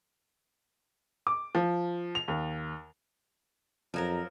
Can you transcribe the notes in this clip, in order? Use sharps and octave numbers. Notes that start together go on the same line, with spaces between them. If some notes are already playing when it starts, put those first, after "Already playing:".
D6
F3
F7
D#2
F2 F3 F#3 A#4